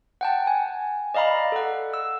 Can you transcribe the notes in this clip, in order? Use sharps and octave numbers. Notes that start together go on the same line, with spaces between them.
F#5 G5 A5
G#5
D5 D#5 F5 A#5 B5
A4 F#5
E6